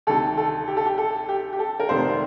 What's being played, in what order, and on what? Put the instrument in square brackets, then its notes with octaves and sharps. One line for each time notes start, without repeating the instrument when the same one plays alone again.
[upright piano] D2 C3 D#3 A4
A4
G4
A4
G4
A4
G4
G4
A4
A#4
F1 F2 C3 D#3 C5